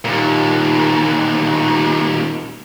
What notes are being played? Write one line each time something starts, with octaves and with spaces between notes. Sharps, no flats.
D#2 A#2